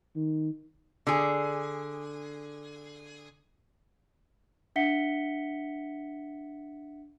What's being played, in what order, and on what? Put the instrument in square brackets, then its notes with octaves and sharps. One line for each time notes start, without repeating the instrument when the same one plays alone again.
[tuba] D#3
[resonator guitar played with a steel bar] D3 G#4
[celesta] D4 E5 F#5 B6 C#7 G7